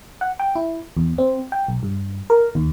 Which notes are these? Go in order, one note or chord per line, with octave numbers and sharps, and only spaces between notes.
F#5
G5
E4
E2
C4
G5
B1
G2
A#4
D#2